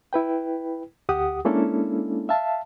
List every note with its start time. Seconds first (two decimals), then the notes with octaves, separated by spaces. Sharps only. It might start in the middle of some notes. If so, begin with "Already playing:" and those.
0.13 E4 B4 G5
1.09 D2 G4 F#5 D#6
1.45 G#3 A#3 C#4 D4 E4 A4
2.29 E5 F5 A5